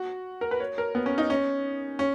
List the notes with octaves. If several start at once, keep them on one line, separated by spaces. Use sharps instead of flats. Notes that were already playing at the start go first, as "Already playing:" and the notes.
Already playing: F#4
A#4
B4
C#5
A#4
B3
C#4
D#4
C#4
C#4